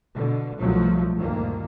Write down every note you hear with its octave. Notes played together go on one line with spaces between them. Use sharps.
B2 D3
C2 B2 F3 F#3 A3
D2 G2 A#2 D#3 A#3